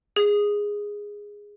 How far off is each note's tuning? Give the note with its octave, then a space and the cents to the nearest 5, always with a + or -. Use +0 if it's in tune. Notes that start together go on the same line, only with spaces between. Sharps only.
G#4 -10